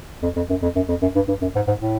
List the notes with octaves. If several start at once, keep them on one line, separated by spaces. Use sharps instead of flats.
F2
F2
F#2
F2
F#2
F2
F#2
G2
G2
F#2
G#2
G#2
A2